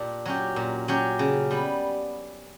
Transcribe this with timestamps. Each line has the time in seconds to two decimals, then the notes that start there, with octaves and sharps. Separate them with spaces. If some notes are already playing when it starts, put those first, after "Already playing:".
Already playing: A#2 D4 G4
0.26 F#3 C#4 G4
0.56 A#2
0.88 F#3 C#4 G4
1.19 C#3
1.51 G3 B3